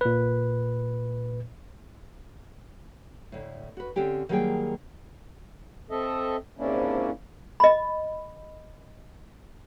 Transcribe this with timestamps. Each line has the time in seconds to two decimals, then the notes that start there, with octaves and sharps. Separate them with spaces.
0.01 A#2 B4
3.32 D2 A2
3.77 F#4 B4
3.96 D3 C4 C#4 G4 G5
4.29 D#3 F#3 G3 A#3 G#4 G5
5.91 C4 A4 D#5 E5
6.58 G#2 C3 A#3 C#4 D4 E4
7.60 D#5 B5